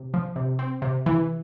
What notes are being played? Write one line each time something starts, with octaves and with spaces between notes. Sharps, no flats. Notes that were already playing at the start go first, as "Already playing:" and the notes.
Already playing: C3
F3
C3
C4
C3
E3